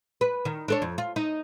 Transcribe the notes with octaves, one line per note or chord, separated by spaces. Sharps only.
B4
D#3
D4 A4 C#5
F2
F4
D#4